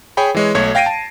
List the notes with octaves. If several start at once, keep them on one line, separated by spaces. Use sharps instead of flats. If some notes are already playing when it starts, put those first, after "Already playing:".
G#4 C#5 G5 B5
E3 G#3 C#5
B1 A3 C#5 G#6
F5 G5 A#6 C7 D7 D#7
A5